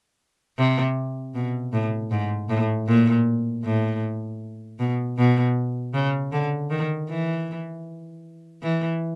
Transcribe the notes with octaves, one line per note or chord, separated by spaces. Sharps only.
C3
B2
A2
G#2
A2
A#2
A2
B2
B2
C#3
D3
D#3
E3
E3